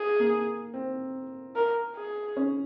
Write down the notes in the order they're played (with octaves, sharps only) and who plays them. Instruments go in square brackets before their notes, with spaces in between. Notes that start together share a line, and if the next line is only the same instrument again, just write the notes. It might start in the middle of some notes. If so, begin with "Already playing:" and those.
Already playing: [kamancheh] G#4
[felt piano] A#3
C4
[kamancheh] A#4
G#4
[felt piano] C#4